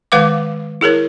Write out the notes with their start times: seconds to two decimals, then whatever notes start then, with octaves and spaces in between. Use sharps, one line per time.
0.12 D#3 G#3 B4 F5 F#5 D6
0.81 E4 G#4 A#4 C#5